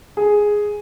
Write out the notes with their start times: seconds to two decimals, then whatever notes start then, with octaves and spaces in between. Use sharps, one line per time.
0.17 G#4